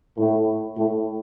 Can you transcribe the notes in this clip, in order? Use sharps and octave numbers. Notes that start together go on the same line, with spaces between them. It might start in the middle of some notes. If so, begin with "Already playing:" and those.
A2
A2